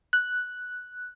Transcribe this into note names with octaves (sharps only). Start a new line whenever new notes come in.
F#6